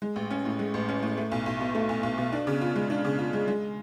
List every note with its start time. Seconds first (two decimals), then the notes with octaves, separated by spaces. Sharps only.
0.02 G#3
0.16 A1
0.31 C#4
0.45 A2
0.59 G#3
0.74 A1
0.89 C#4
1.03 A2
1.17 A3
1.32 B1
1.46 B1
1.60 B2
1.75 A3
1.89 B1
2.03 B1
2.18 B2
2.32 D4
2.47 C#3
2.61 F4
2.76 G#3
2.90 D4
3.05 C#3
3.19 F4
3.33 G#3
3.48 G#3